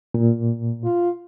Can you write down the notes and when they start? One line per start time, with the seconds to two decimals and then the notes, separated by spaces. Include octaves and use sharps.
0.14 A#2
0.84 F4